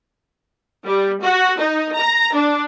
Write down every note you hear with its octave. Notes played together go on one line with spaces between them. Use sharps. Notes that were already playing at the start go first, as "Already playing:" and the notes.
G3
F#4
D#4
A#5
D4